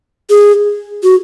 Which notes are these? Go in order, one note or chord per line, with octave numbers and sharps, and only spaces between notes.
G#4
F#4